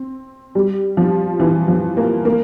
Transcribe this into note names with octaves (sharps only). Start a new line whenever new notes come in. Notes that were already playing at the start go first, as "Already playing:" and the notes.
Already playing: C4
G3
F3
E3
F3
A#3
A#3